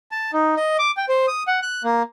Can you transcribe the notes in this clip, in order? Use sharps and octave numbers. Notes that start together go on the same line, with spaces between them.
A5
D#4
D#5
D6
G5
C5
D#6
F#5
F#6
A#3